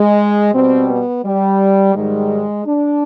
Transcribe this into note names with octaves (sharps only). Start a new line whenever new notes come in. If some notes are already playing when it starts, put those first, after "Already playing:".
Already playing: G#3
B2 G3 C4
B3
G3
G#2 D#3 G3 G#3
D4